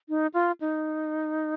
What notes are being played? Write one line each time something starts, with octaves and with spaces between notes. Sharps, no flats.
D#4
F4
D#4